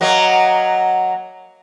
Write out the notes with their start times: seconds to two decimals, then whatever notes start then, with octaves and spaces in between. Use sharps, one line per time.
0.01 F#3 A#3 D#5